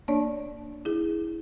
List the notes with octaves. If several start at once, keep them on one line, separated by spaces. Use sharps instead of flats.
A#3 D4 C#5 D5
E4 G#4